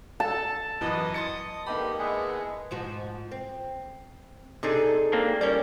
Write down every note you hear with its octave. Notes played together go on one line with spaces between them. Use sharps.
A4 A5
F#2 E3 B3 D#5
C6 D#6 A6 C#7
G2 D3 A#3 D#4 G4 B5
G#3 B3 E4 G#4
G#2 F3 F#4
C4
C3 D4 D#4 G#4 A4
A#3 C4 D4
G3 C#4 E4 A#4 D5